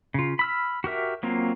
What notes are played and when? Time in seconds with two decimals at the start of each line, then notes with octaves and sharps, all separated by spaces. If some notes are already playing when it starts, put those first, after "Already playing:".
0.14 C#3 F4
0.39 B5 E6 F6
0.84 F#4 G4 A#4 E5
1.23 F#3 A#3 C4 F4